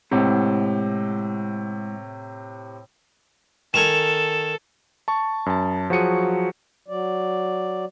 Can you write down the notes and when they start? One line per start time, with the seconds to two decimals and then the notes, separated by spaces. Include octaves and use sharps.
0.11 A2 C3 G#3 E4 F#5
3.74 D#3 A4 A#4 G#5 E7
5.08 A5 C#6
5.46 F#2 A5
5.90 F3 F#3 F#4 G#4 C#7 D#7
6.88 F#3 D5